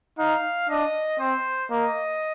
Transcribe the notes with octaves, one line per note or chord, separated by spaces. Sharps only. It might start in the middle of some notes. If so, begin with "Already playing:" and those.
D#4 F5
D4 D#5
C4 C5
A#3 D#5